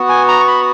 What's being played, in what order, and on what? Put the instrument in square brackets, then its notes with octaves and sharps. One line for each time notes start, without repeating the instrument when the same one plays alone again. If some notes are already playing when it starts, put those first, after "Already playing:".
Already playing: [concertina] B3 F#4
G#5
A#5
C#6
B5